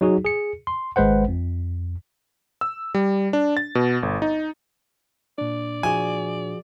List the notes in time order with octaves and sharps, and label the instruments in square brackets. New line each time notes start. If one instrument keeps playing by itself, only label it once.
[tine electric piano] F#3 D#4 F#4 G#4
G#4 C#7
C6
G#1 G#3 B4 C5 F#5
F2
[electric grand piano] E6
G3
D4
A6
B2
G1
D#4
[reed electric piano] A#2 D4 [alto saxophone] D5
[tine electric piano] F3 F#4 G#4 [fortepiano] G#5